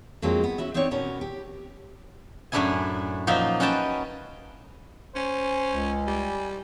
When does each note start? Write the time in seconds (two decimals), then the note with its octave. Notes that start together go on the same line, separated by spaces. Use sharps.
0.22 F2 F#3 G#3 A#3 C4
0.44 B3
0.58 C#4 F#4 E5
0.74 B3 C4 D#4 G4 C#5 D5
0.91 B2 B3 C#4 A#4
1.21 G4
2.52 F#2 A2 A3 D4 E4 G#5
3.27 A#2 F3 F#3 D#4 E5
3.60 C#4 F#4 B4 G5 A5
5.16 C#4 C5 G#5
5.72 C#2
6.07 G3 G4